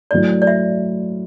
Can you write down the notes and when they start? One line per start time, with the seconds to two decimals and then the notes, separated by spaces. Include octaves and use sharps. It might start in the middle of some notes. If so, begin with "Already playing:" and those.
0.11 F#3 A3 E4 D5
0.42 D5
0.47 E5